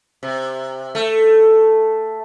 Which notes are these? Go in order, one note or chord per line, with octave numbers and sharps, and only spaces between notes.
C3
A3